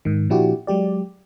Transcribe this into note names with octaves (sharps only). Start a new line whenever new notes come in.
G#2 D#3
A#2 F3 D4 E4 F#4 G4
F#3 G#3 G4 D5